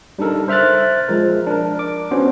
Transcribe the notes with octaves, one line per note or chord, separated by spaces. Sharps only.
G3 D4 D#4 A4 A#4
C5 E5 F6 F#6 A6
F3 G#3 A#4
D4 A#4
D6
B3 C#4 D4 F#4 C5